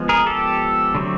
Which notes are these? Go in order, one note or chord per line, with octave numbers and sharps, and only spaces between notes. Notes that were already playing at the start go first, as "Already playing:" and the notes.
Already playing: F3 G#3 B3
G#4 A#4
G4 A4
D3 F#3 A3 C4